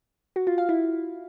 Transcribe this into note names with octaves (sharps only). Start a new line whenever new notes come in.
F#4
F4
F5
E4